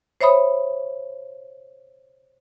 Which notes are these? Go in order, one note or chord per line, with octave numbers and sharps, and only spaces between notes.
C5 C#5 E5 B5 D#6